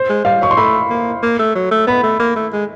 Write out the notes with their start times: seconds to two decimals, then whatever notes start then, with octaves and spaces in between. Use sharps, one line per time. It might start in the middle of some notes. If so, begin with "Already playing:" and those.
Already playing: C5
0.09 G#3
0.25 G3 F5
0.41 F#3 C#6
0.51 C6
0.57 A3 B5
0.90 A#3
1.23 A#3
1.39 A3
1.56 F#3
1.71 A3
1.87 B3 B5
2.04 A3
2.20 A#3
2.36 A3
2.53 G#3